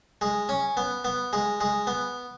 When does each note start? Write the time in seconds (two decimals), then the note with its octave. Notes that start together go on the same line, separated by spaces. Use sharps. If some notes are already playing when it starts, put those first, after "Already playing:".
0.21 G#3
0.49 C#4
0.77 B3
1.05 B3
1.33 G#3
1.61 G#3
1.87 B3